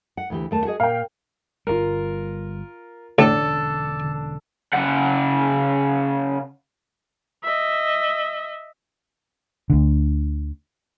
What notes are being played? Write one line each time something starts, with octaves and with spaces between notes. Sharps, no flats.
F#5
D2 E3 G4
D#2 A3 A5
F#4 G#4 D#5
A#2 F5 G5
G1 G3 F4 A#4
E1 A2 D3 C#4 D4 A4
C#3 F#5
D#5 E5
D2 D3